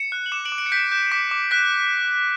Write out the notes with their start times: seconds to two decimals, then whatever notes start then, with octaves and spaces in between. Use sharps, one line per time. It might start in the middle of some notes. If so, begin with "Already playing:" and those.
Already playing: C#7 E7
0.12 F#6
0.26 F#7
0.32 D6 C#7 E7
0.45 D7 F#7
0.52 D6
0.58 D7 F#7
0.66 C#7
0.72 G6 B6 D7
0.92 G6
1.12 D6 B6
1.31 D6
1.51 F#6 B6